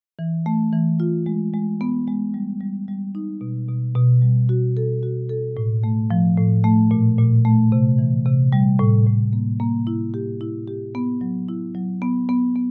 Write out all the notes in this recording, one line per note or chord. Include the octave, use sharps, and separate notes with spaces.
E3
A3
E3
F4
G#3
G#3
B3
G#3
G3
G3
G3
D#4
B2
B2
B2
G3
F#4
A4
F#4
A4
A2
A3
F3
A2
A3
A#2
A#2
A3
C3
E3
C3
G3
A2
A2
A#3
A#3
E4
G4
E4
G4
B3
F#3
E4
F#3
B3
B3
B3